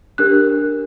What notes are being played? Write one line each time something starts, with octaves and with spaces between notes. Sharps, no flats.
D4 G4 A#4 F#6